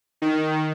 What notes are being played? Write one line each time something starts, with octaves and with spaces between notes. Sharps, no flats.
D#3